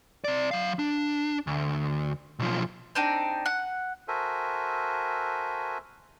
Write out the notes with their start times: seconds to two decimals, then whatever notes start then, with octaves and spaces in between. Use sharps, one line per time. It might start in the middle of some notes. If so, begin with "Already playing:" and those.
0.24 C4 D5
0.51 F#3 F5
0.79 D4
1.47 D2
2.39 B1 F3
2.95 C4 D4 D#4 G5
3.46 F#5
4.08 F#4 A4 A#4 C5 E5 G#5